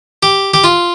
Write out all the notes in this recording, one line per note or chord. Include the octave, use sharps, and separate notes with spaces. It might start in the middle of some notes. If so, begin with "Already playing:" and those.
G4
G4
F4